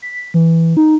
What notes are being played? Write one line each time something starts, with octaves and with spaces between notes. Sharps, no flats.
B6
E3
D#4